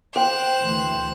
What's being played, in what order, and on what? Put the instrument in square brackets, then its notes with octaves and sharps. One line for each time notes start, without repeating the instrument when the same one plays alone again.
[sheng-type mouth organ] C5 [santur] G5 [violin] F#6 E7
[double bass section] D2 E3 A3